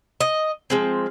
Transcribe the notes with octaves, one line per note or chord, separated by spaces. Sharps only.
D#5
F3 G#3 C4